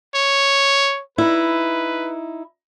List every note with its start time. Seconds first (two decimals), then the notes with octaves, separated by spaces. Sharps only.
0.15 C#5
1.18 D#4 E4 B4